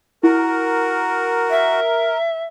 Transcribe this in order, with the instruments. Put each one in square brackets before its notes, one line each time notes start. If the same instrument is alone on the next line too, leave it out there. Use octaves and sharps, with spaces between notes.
[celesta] E4 [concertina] F#4 [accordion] A#4
[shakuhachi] E5